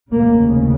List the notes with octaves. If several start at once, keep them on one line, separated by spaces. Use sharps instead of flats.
F1 D#2 C#3 A#3